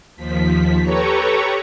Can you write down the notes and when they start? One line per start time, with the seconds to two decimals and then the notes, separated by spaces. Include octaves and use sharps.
0.17 D#2 F3 B6
0.82 G4 A4 B4 C#5 A#5 C#6